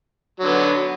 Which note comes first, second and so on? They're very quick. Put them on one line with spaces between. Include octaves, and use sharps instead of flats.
F#3 D3 B3